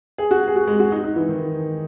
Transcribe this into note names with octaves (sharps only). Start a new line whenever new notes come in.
G#4
F#4
G#4
F#4
G#3
F#4
D#4
D#4
E3
D#3